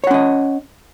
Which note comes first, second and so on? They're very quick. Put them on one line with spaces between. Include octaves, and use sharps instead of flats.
C#5 F#5 C#4 D#5